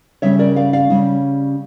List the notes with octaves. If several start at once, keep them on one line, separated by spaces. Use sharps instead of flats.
C#3 G3 C#4 C#5 E5
A#4 D5
D5 F5
D5 F5
C#3 G3 C#4